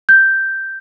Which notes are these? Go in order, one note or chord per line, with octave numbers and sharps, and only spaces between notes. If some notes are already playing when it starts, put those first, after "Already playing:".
G6